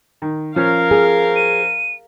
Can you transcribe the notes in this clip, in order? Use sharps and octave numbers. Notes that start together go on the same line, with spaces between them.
D#3
F3 C#4 A#4 F5 F6
G#4
D#7